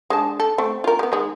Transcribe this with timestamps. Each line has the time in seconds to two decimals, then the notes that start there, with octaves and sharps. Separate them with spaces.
0.10 G#3 D4 A5
0.40 A4
0.58 A3 C4
0.84 F4 A#4
0.99 G#3 B3
1.12 D#3 G#3